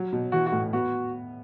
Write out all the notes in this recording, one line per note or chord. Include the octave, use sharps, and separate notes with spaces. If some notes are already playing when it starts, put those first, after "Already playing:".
Already playing: F#3
B2
E3 F#4
F#4
A2
B3 F#4